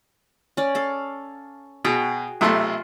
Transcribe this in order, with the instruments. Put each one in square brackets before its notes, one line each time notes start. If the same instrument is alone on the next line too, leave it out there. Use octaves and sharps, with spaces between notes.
[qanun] C#4 D5
A4 F5
[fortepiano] B2 [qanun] F#4 G#4 G5
[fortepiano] B1 C3 A3 [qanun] F4 C6